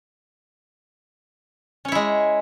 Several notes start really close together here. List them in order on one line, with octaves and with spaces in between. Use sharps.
C#4 C#5 E4 G#3